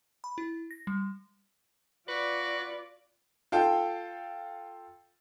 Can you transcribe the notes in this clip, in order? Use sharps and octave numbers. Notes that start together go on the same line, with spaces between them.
B5
E4
A#6
G3
F4 F#4 B4 D5
F4 A4 G5